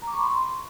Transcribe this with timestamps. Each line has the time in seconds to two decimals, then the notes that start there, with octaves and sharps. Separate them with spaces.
0.02 A#5
0.07 D6
0.13 C#6
0.18 B5
0.23 C6